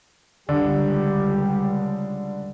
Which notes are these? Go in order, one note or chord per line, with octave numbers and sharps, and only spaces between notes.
C#2 D3 G3 G4